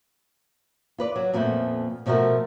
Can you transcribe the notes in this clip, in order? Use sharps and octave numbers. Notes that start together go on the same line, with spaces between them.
F4 B4 D5
F#3
F2 A#2 F3 A3 B3
B2 F3 A3 F#4 A#4